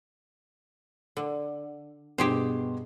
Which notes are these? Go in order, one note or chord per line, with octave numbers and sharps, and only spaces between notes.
D3
G2 B2 G4 G#4 C5 C6